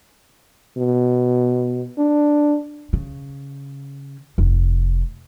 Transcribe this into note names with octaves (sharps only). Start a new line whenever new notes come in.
B2
D4
C#3
F1